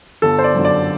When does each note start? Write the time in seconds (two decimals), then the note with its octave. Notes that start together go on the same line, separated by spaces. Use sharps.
0.22 G1 A4
0.38 C5
0.44 D5
0.55 F#2 D3
0.65 D5